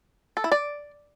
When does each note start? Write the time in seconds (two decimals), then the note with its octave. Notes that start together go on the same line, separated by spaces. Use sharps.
0.37 A4
0.44 E4
0.52 D5